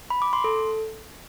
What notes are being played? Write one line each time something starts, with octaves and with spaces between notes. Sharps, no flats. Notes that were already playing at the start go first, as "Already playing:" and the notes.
B5
D6
C6
A4